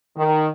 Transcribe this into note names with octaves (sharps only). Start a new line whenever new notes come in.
D#3